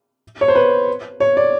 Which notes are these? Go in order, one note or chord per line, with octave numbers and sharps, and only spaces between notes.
C#5
C5
B4
C#5
D5